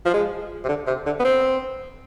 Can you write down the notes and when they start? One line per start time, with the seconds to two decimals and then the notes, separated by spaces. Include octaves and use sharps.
0.06 F3
0.14 G#3
0.64 C3
0.68 D3
0.87 C3
1.06 D3
1.20 B3
1.25 C4